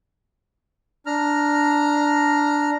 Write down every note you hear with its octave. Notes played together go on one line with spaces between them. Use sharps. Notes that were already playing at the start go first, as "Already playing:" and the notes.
D4 A#5 F6